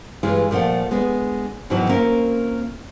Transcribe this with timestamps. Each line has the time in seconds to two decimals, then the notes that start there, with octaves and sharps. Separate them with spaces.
0.23 G2 E3 G3 G#3 F4
0.51 A#2 F3 A3 F5 F#5
0.91 G#3 B3 D4
1.70 G#2 B2 D#3 E3 F#3
1.89 A#3 C4 C#4 F4 A#4